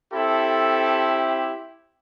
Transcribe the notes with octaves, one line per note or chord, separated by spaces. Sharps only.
C4 E4 G4 A4